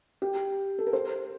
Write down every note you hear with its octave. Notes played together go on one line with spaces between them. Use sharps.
G4
A4
A#4
C5